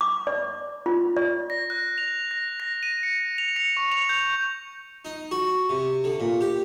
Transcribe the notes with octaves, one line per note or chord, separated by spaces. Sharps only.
D6
D5
F4
D5
A#6
F#6
F7
A#6
A#6
D#7
C#7
F7
C#7
C#6
F7
G6
D#4
F#4
C3
D3
A#2
G4